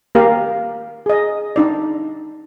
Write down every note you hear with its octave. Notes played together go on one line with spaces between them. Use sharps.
A#3 G4 A#4 F5
G#4 D#5
D4 D#4 D5